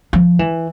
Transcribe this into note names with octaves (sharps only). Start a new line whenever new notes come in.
F3
E3